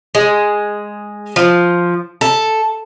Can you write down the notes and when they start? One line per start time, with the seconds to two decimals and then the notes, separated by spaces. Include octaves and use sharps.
0.15 G#3
1.36 F3
2.21 A4